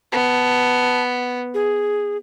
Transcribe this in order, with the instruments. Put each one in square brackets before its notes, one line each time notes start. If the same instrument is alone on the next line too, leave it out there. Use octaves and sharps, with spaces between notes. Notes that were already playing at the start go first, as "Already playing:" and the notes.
[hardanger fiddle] B3 [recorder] A5
[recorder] G#4